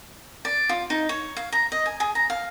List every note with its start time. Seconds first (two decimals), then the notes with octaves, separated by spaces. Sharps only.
0.45 D5
0.69 F4
0.90 D#4
1.09 C#5
1.37 F5
1.52 A#5
1.72 D#5
1.86 G#5
2.00 G#4
2.15 A#5
2.30 F5